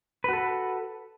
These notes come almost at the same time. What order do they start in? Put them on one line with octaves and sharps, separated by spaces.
B4 F#4 A4